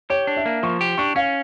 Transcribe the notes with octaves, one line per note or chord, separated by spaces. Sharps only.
G4 C#5
D4
E5
A#3
F3 C#6
G4
D4 C#6
C#4 F5